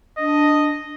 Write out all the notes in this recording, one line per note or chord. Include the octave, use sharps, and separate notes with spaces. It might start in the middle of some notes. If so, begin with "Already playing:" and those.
D4 D#5